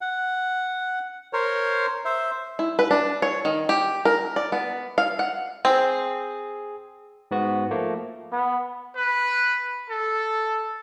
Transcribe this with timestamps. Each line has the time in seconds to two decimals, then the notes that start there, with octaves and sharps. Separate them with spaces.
0.01 F#5
1.33 A#4 C5 C#5
2.05 C5 E5
2.59 E4
2.79 B4
2.91 D4
3.22 C#5
3.45 D#3
3.69 G4
4.05 A#4
4.36 D5
4.52 B3
4.98 F5
5.19 F#5
5.65 C4 G#4
7.31 G#2 B3 F#4
7.71 F3 A3 A#3
8.32 B3
8.95 B4
9.89 A4